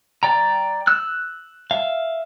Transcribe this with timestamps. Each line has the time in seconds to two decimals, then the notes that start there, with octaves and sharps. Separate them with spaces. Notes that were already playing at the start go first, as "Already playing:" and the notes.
0.23 D5 G5 A#5
0.87 E6 F#6
1.71 E5 F5